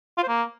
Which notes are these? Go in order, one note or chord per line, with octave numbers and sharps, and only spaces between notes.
F4
C5
A#3